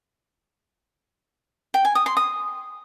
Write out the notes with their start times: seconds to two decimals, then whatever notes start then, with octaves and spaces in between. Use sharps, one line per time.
1.74 G5
1.85 G#5
1.95 D#6
2.06 C6
2.17 D#6